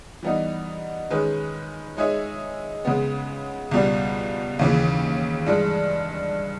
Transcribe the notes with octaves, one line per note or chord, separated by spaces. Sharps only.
E3 G3 B3 D#4
D#3 G#3 C#4 G#4 B4
G#3 D#4 G#4 C#5 E5
C#3 G#3 B3
C#2 B2 G3
D#2 C#3 E3
G2 E3 G#3